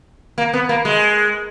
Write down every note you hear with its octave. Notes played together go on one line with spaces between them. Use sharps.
A#3
B3
A#3
G#3